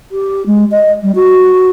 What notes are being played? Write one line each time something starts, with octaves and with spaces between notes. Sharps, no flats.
G4
G#3
D#5
G3
F#4